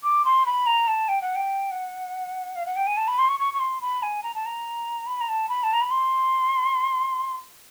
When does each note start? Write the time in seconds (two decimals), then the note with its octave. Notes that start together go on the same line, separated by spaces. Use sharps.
0.03 D6
0.25 C6
0.46 B5
0.66 A#5
0.88 A5
1.08 G5
1.22 F#5
1.35 G5
1.71 F#5
2.55 F5
2.66 F#5
2.76 G5
2.87 G#5
2.97 A5
3.08 B5
3.18 C6
3.29 C#6
3.40 C#6
3.54 C#6
3.60 C6
3.81 B5
4.03 G#5
4.23 A#5
4.35 A5
4.46 A#5
5.07 B5
5.21 A#5
5.28 A5
5.49 B5
5.63 A5
5.73 A#5
5.81 B5
5.91 C6